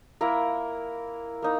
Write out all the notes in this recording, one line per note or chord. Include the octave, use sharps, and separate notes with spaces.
A#3 E4 A#4
A#3 D#4